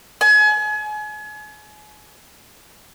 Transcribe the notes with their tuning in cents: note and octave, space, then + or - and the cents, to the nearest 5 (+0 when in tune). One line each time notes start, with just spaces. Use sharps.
G#5 +35